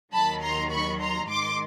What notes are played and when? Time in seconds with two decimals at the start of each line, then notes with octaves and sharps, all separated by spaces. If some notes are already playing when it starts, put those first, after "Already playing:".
0.12 D#2 D#3 F#3 A5 B5
0.41 A#5 C6
0.70 B5 C#6
1.00 A#5 C6
1.28 G#2 D#3 G#3 C6 D6